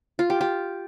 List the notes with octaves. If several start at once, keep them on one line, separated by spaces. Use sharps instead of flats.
F4
G4
G4